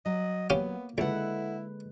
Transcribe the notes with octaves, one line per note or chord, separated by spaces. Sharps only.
F#3 D#5
A#3 B3 C#4 G4 F5
C#2 D3 G#3 E4 A4 B4 F#5